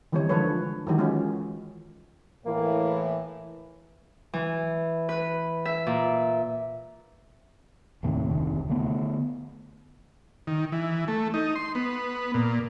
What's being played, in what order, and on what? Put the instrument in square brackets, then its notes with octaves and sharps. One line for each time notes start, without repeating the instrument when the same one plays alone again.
[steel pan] D#3 E3 G3 C4 D#4 C#5
D3 F3 G#3 A4 B4 C#5
D#3 E3 F#3 G#3 F#4 G4
G#3 C#4 F4
[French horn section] A2 E3 [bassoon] A#3
[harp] E3
B4
E5
A#2
[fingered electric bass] D#2 A2 C3
F1 D2 C3 D#3
D3 A3 B3
[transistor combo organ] D#3
E3
A3
D#4
C6
B3
A#2